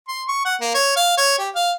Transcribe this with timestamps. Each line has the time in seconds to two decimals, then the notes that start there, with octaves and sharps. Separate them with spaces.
0.08 C6
0.28 C#6
0.45 F#5
0.61 A#3
0.74 C#5
0.96 F5
1.18 C#5
1.38 G4
1.55 F5